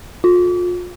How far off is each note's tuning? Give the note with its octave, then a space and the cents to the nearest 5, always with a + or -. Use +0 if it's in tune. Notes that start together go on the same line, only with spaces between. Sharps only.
F4 +35